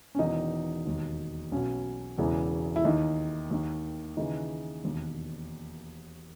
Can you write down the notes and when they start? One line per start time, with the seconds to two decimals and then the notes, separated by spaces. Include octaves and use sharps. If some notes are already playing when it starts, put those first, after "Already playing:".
0.15 C#4
0.19 E1 E2 D#3 D#4
0.85 E1 D#2 D#3
1.52 B1 B2 C#4
2.18 E1 E2 C#3 E3
2.76 E4
2.85 D#2 D#3 D#4
3.51 D#2 D#3
4.17 D#2 C#3 E3 D#4
4.84 E1 D#2 D#3